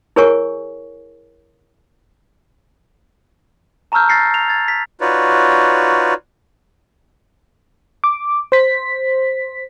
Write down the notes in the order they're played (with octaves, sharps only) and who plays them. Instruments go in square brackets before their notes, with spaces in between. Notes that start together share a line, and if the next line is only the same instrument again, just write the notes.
[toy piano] E4 G#4 A#4 C#5 G#5 C#6
[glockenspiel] A5 A#5 C#6 E6 F6 G6
A6 A#6 C7 C#7
F7
G#6 A6
B6
[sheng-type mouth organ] D#4 F4 F#4 B4 C#5 D5
[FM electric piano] D6
C5 B6